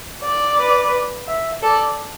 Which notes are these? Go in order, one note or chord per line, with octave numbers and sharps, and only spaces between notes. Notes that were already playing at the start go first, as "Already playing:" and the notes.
D5
B4
E5
A4 D5